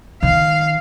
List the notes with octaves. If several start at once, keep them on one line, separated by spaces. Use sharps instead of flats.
D#3 F5